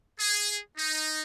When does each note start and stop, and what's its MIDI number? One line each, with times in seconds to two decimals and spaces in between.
0.20 0.58 68
0.77 1.22 63